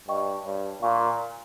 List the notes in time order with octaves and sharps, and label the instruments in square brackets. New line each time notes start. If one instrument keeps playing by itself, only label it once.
[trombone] G2 [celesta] D#5 G5 C#6
[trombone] G2 [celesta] C#5
[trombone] A#2 [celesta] F5 A#5 C#6